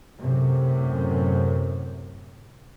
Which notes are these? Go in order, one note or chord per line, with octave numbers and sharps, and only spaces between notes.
F#2 A2 C3